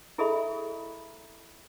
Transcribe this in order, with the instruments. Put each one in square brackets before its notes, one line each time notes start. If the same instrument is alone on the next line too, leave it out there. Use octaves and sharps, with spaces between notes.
[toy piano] E4 G#4 A4 D#5 E5 B5